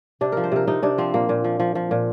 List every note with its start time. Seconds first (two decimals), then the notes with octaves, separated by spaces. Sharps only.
0.21 C3 D4
0.32 F3 A#4
0.44 C5
0.52 C3 A#4
0.67 C3 D#4
0.82 C3 D4
0.98 F3 C4
1.14 A#2 A#3
1.29 A#2
1.44 F3
1.59 F3
1.75 F3
1.91 A#2